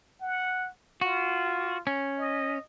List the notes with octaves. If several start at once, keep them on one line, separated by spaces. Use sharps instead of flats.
F#5
F4 F#4
C#4
D#5